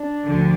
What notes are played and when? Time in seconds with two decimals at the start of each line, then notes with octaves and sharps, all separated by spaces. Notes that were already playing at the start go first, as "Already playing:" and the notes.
Already playing: D4
0.24 D2 D3 F3